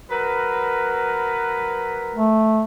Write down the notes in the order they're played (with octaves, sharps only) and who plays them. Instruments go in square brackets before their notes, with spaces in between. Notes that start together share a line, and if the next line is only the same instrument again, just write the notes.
[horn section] F#3 A#4 B4
[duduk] A3